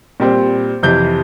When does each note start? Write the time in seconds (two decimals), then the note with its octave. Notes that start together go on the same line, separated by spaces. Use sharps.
0.20 A#2 G3 C4
0.83 F2 C3 E3 G6